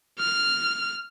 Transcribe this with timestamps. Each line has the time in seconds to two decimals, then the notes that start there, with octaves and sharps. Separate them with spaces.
0.19 F6